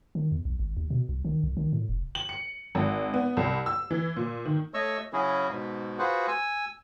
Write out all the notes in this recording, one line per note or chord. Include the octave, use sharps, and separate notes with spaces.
D#3
E2
B1
G#1
D#2
B2
C2
D#3
C2
D#3
A2
F1
F#7
C#7
G#1
B3
C2
E6
E3
A#2
D#3
A3 C#5 D#5 C#6 E6
C#3 F#3 C#4 E4 F#4 G#4
G#2 B2
F4 F#4 G#4 B4 C5 F#5
G#5 E6